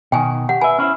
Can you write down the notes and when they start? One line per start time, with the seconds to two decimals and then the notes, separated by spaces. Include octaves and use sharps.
0.12 B2 D#3 G5 G#5
0.49 G4 F#5
0.61 B4 E5 G#5
0.79 C#4 E4 C5